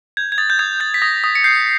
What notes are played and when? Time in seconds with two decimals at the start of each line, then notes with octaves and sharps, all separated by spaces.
0.17 G6 G#6
0.32 G#6
0.38 D#6 A6
0.50 G6
0.59 D#6 G#6
0.80 G6 A6
0.94 B6
1.02 D#6 A#6
1.24 D#6
1.35 C#7
1.44 G6 C7